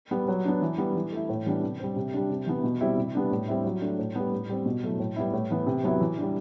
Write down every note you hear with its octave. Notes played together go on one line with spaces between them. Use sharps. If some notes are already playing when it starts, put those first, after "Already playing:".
G3 B3
F#3
B3 D4
E3
G3 B3
E3
A3 E4
A2
E3 G3 B3 D4
C3
G3 C4
C3
G3 D4
C3
E3 B3
B2
G3 C4 E4
C3
G3 B3 D4
A2
G3 C4 E4
F#3
A3 D4
A2
G3 B3
A2
G3 C4
B2
F#3 A3 E4
A2
G3 B3 E4
A2
E3 B3
C3
F#3 B3 E4
E3
G3 D4